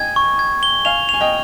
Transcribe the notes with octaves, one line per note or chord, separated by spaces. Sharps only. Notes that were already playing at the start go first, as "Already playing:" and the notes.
Already playing: D#5 G5 G#5 G#6
C#6
G#6
G7
F5 G#5 F7
G#5 F7
D#5 G5